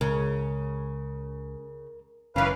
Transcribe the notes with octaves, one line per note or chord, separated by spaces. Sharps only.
C#2 C#3 A#4
F#1 D#3 E3 C#4 B4 F5